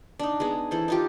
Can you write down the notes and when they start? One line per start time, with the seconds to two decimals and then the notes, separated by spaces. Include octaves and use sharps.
0.19 D4 D#4
0.40 G#3 B3 G#4
0.71 E3 A4 C5
0.88 D#4 F4 G4